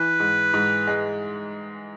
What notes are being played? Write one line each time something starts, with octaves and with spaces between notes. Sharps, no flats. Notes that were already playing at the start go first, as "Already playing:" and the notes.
Already playing: E3 B4
G#2
G#2
G#3